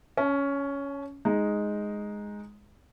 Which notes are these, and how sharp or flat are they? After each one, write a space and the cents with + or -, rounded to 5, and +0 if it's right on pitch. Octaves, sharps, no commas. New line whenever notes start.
C#4 +10 A5 -40
G#3 +0 D#4 +0